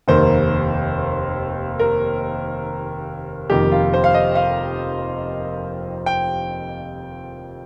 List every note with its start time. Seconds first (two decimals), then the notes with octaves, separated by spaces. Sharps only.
0.08 F1 D#2 D#3 A#3 C5
1.79 A#4
3.50 F1 F2 D#3 A#3 G4
3.71 F4
3.93 C5
4.04 F5
4.14 D#5
4.35 F5
6.06 G5